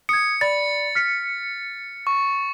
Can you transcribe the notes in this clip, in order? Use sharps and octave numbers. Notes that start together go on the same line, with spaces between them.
D#6 G#6 C#7
D5 B5 A6
F6 B6 C#7
C#6